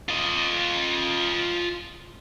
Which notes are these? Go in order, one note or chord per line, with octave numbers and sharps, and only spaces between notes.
F4 D#5